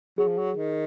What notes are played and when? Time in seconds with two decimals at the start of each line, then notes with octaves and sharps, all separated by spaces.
0.18 F#3 G#4
0.28 F3
0.38 F#3
0.57 D#3